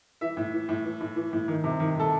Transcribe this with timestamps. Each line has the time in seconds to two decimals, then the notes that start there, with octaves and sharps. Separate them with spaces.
0.21 E3 E5
0.37 A2
0.53 E3
0.69 A2
0.84 E3
1.01 A2
1.16 E3
1.33 A2
1.48 D#3
1.64 C3
1.80 D#3
1.96 C3 A4